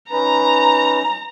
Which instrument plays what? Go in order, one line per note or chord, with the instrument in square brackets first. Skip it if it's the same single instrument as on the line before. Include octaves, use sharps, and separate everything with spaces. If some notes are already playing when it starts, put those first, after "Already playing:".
[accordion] C#4 D#4 B4 [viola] A#5